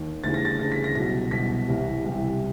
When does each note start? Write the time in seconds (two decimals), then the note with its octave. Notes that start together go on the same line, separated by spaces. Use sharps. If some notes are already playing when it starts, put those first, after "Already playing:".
Already playing: D#2 D#3
0.23 D2 C#3 E3 G3 A6
0.34 A#6
0.45 A6
0.59 D2 C#3 E3 G3 A#6
0.72 B6
0.84 A#6
0.95 C2 B2 F#3 A#6
1.31 C2 B2 F#3 B6
1.68 C2 C3 E3 G3
2.04 C2 C3 E3 G3